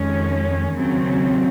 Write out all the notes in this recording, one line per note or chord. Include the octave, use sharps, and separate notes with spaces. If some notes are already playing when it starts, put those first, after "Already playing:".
Already playing: F2 D#3 G#3 C#4
D#2 C#3 F#3 C4